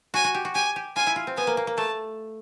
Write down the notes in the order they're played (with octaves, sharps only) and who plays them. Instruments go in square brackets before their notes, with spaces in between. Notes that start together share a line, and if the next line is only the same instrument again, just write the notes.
[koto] F#4 [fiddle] G#5
[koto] F#4
G4
F#4
[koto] G4 [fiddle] G#5
[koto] G4
[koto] F4 [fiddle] G#5
[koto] E4
F4
C4
[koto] B3 [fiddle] G#5
[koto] A#3
A#3
A#3
[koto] A3 [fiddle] A5